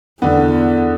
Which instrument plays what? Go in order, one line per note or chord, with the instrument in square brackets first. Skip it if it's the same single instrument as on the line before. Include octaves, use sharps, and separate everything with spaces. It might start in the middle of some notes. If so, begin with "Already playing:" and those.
[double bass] E2 [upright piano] D3 B3